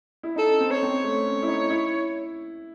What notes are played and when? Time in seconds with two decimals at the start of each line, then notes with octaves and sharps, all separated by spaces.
0.23 E4
0.36 D#4 A4
0.48 C#4
0.60 C4
0.71 C#5
0.82 C4
1.03 A3
1.26 C#4
1.43 E4
1.48 D#4
1.70 E4